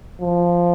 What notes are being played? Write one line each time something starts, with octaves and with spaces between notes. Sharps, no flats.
F3